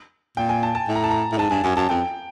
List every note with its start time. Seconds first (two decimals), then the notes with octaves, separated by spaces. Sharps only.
0.37 A#2 G5
0.49 G#5
0.63 A5
0.75 A5
0.88 A2
0.95 A#5
1.04 A5
1.11 A#5
1.32 A2
1.38 G#2 A5
1.50 G2 G#5
1.63 F#2 G#5
1.76 F#2 A5
1.89 F2 G5